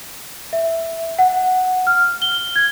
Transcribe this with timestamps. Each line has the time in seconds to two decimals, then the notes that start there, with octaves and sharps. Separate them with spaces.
0.53 E5
1.19 F#5
1.87 F6
2.22 G7
2.56 G#6